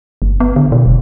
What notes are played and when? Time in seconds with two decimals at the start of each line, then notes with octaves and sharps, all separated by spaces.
0.22 G1
0.40 B3
0.56 D3
0.72 B2
0.86 E1